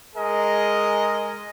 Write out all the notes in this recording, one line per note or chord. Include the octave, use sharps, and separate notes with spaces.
G#3 G#4 A#4 D#5